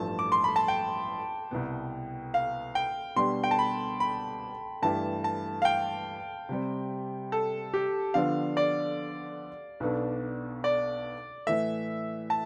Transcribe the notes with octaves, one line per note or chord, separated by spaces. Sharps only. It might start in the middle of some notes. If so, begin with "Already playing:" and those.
Already playing: A1 G2 F3 A3 A5
D6
C6
B5
A5
G5
C2 B2 B3
F5
G5
B2 G3 D4 G4 C6
G5
A5
B5
B5
G2 E3 A3 E4 G4 A5
A5
F5
G5
C3 G3 C4
A4
G4
D3 F3 B3 D4 F5
D5
B1 B2 B3 D4 A4
D5
A2 E3 A3 E5
A5